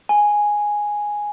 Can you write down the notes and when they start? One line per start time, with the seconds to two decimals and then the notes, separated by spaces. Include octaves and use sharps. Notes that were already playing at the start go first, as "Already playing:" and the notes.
0.09 G#5